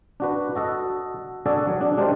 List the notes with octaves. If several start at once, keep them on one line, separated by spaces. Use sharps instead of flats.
D4 F#4 B4
F#4 A4 D#5
D4 F#4 G#4 A4 D5
F#3
D4
G#3 D4 G4 A#4 C5 D5